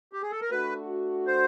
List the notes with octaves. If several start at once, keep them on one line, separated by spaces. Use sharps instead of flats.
G4
G#4
A4
A#4
A3 D4 F#4 B4
C5